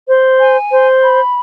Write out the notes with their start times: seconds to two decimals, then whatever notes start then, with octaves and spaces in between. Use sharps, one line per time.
0.08 C5
0.39 G#5
0.70 C5
1.02 B5